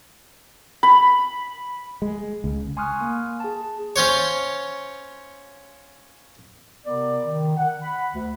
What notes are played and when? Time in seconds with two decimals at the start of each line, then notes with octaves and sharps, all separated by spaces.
0.83 B5
2.02 G#3
2.44 C#2
2.77 G#5 C6 C#6 D#6 F6 F#6
3.01 A#3
3.40 G#4 A5
3.96 C#4 F4 C5 C#5
6.86 C3 B3 A#4 D5
7.25 D#3
7.56 F#5
7.81 F#5 B5
8.13 D2